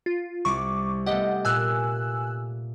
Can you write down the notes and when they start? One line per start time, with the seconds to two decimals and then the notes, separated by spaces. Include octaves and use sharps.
0.06 F4
0.45 C2 C#6 D6
1.06 A3 B3 G4 D#5 F#5
1.45 A#2 G#5 E6 F#6